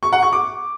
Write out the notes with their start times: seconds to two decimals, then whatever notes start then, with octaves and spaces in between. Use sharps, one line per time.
0.03 C#6
0.13 F#5
0.23 C#6
0.32 D6